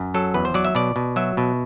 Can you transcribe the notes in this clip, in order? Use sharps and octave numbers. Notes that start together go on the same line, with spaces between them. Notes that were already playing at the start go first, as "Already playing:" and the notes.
Already playing: F#2
F#3 A4
E2 B4
C5
F#3 D5
E5
B2 D5
B2
F#3 E5
B2